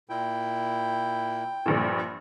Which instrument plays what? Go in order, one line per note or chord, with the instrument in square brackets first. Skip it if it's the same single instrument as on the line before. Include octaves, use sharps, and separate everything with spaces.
[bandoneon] A#2 E4 [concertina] G5
[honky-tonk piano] A#1 G2 A#2